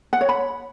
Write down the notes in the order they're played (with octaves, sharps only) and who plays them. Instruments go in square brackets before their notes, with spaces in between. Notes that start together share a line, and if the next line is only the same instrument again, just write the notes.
[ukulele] F#5
C#5
B5